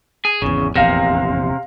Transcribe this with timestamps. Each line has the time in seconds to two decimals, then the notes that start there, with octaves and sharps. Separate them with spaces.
0.25 G#4
0.42 G#1 E2 C#3
0.76 F1 A#1 E2 C3 F5 A#6